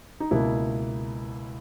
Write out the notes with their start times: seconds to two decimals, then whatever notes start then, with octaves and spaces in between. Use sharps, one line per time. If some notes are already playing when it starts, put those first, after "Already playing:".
0.20 D#4
0.31 C#2 B2 A#3 E4